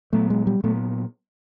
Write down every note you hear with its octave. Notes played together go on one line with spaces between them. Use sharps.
A#2 F#3 A3 B3
G#3
G3
A#2 F#3 A3 B3